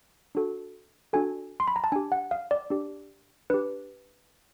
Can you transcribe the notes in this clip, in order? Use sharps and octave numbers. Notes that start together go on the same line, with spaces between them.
D4 F#4 A4
D4 F#4 A4 G#5
C6
B5
A#5
A5
D4 G4 G#5
F#5
F5
D5
D4 G4
D4 G4 B4